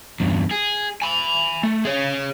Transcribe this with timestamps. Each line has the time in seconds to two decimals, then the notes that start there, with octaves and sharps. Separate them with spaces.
0.20 E2 G2
0.51 G#4
1.02 G#5 B5
1.63 A3
1.85 G#4 C#5